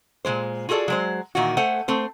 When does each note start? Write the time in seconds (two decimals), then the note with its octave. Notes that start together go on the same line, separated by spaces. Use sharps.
0.25 A#2 F#3 G#3 C5
0.69 F4 F#4 G#4 A4 D5
0.88 F#3 G#3 C5
1.35 A#2 D#3 E3 F4 F#4
1.57 A3 C5 F#5 G#5
1.88 A3 C4 C5